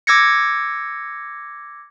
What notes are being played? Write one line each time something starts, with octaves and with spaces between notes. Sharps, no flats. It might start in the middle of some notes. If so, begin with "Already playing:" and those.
D6 E6 G#6 A#6 C#7